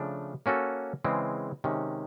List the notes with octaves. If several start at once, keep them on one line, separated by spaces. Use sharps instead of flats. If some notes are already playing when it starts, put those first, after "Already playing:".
Already playing: C#3 F3 A3 D4
A#3 C#4 F#4 A4
C#3 E3 G#3 C4
C3 D#3 G#3 C#4